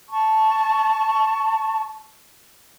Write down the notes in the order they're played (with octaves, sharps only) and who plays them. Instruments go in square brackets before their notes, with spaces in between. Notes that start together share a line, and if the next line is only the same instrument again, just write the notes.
[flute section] A5 C#6